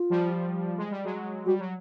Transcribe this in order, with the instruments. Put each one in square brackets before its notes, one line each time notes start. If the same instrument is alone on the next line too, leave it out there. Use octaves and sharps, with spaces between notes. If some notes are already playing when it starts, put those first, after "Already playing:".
Already playing: [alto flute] F4
[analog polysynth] F3 G3
G#3
G3
F#3 G#3
[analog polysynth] G3 [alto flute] F#4
[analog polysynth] F#3